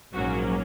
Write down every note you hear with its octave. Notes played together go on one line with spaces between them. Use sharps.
A#1 G#2 F#3 A#3 C#4 F#4